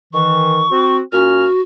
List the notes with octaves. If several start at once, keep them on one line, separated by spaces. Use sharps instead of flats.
D#3 E3 C#6
C4 F#4
A#2 C#4 F#4 F6